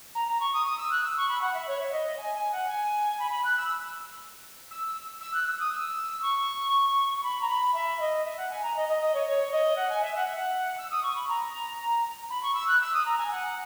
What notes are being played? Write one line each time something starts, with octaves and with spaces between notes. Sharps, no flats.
A#5
A#5
C#6
D#6
D#6
E6
F#6
E6
C#6
B5
F#5
E5
C#5
E5
D#5
G#5
G#5
F#5
G#5
B5
B5
F#6
E6
E6
E6
F#6
E6
D#6
E6
C#6
C#6
B5
A#5
B5
E5
D#5
E5
F#5
G#5
A#5
D#5
D#5
D#5
C#5
C#5
D#5
F#5
G#5
E5
F#5
E5
F#5
E6
D#6
C#6
B5
A#5
B5
C#6
E6
F#6
E6
D#6
A#5
G#5
F#5